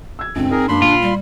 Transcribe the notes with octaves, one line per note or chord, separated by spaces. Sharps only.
E6 G#6
C#2 G2 C4
D#4 G#4 A#4
F#1 A#3 D4 B5 C6 D6
A#2 F4
G3